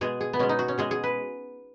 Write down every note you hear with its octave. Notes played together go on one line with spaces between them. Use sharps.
B2 G#3 G#4
G#4
B3
B2 G#3 C#4
D#4
F#4
C#4
B2 G#3 G#4
G#4
B4